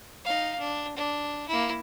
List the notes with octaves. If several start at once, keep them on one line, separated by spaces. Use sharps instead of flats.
D#4 F5
D4
D4
A#3 E4